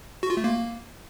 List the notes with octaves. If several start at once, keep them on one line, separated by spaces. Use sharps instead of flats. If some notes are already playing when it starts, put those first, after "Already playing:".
F#4
F4
A3
A#3